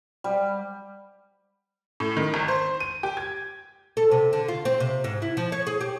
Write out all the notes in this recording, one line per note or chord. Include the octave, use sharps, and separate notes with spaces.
G3
A2
D#3
G#1
C5
D#7
G4
G#6
A4
C3
D3
F4
C4
C3
G#2
E4
F3
C#5
G#4
G4